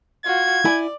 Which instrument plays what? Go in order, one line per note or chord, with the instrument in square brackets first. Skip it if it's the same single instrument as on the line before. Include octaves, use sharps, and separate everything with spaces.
[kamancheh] F4 F#4 [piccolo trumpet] G#6
[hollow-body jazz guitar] E4 G#5 [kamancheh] D5